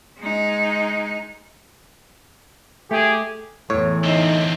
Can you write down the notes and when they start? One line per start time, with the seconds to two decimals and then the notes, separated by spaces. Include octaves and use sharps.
0.19 G#3 D#4
2.91 A3 G4 G#4
3.70 E2 A2 E3 C#5
4.04 D3 C4 D#4